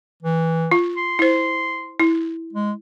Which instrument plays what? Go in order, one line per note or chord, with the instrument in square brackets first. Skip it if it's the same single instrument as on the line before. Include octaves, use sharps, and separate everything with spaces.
[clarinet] E3
[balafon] F4
[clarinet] C6
[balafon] E4 C5
E4
[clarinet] G#3